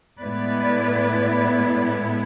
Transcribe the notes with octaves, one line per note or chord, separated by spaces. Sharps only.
A2 G#3 B3 E4 B4 D5